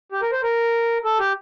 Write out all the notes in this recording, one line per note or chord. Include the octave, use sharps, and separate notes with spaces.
G4
A#4
C5
A#4
A4
G4